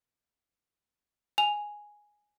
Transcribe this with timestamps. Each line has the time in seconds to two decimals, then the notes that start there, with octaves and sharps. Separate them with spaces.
1.38 G#5 F7